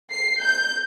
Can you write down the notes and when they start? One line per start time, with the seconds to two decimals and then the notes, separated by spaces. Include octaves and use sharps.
0.11 C7
0.40 G6